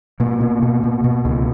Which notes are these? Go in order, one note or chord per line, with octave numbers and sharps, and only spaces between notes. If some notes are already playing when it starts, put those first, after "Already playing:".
B2 A#3
B2
B2
B2
B2
C#2